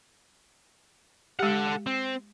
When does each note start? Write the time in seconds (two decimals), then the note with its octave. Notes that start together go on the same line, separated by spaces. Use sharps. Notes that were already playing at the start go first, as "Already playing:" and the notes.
1.39 G#3 G4 A4 F#5
1.86 C4